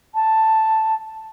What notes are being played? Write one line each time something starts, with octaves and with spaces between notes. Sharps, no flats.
A5